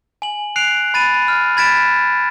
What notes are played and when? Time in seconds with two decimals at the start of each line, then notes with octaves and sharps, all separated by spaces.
0.22 G#5 F#7
0.56 F#6 C7 D7 F7
0.94 B5 A6 D#7
1.28 F6
1.57 B5 G#6 A6 B6 D7 E7